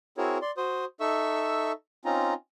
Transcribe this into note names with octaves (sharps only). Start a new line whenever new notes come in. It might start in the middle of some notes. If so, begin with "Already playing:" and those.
C4 E4 F#4 G#4 A#4 C#5
D5 C6
F#4 C5 C6 D#6
D#4 A4 E5 C#6 E6
C4 C#4 D#4 F4 A#5